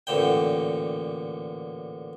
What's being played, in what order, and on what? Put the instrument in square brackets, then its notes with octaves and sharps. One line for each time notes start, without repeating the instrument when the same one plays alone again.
[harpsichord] A1 A#2 D3 G5